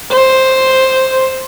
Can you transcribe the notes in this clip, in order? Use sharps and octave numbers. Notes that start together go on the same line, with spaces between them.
C5